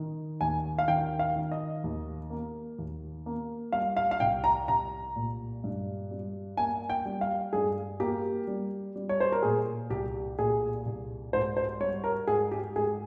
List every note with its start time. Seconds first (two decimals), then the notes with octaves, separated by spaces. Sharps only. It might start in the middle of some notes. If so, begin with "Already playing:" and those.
Already playing: D#3
0.41 D#2 G#5
0.78 F5
0.88 D#3 G5
1.19 F5
1.36 D#3
1.51 D#5
1.84 D#2
2.30 A#3
2.78 D#2
3.26 A#3
3.72 G3 F5
3.97 F5
4.11 F5
4.20 C2 G5
4.44 A#5
4.68 C2 A#5
5.16 A#2
5.64 G2
6.11 G3
6.57 A#3 G#5
6.90 G5
7.06 G3
7.21 F5
7.53 G2 G#4
8.00 A#3 G4
8.47 G3
8.96 G3
9.09 C#5
9.20 C5
9.32 A#4
9.43 A#2 G#4
9.90 C2 G4
10.39 A#2 G#4
10.86 C2
11.33 G#2 C5
11.57 C5
11.80 G3 C#5
12.04 A#4
12.27 G#2 G#4
12.51 G4
12.76 G#2 G#4